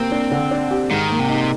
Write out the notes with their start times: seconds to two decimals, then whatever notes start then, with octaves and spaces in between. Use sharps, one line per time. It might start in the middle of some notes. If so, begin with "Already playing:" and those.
Already playing: C3 A#3 C4
0.12 D4
0.31 D3
0.51 D4
0.71 G4
0.91 G#2 D#3
1.10 A#3
1.19 C3
1.30 D#4